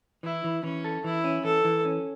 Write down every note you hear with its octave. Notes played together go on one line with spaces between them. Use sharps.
E3 E4
E3
E3 C#4
A4
E3 E4
C#4
E3 A4
E3
C#4